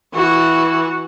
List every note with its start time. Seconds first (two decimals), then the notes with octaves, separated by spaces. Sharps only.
0.14 E3 F#4